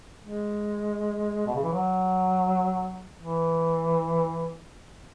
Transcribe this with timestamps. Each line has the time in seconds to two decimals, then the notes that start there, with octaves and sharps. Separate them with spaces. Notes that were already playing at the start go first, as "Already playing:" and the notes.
0.23 G#3
1.46 B2
1.54 C#3
1.63 E3
1.72 F#3
3.21 E3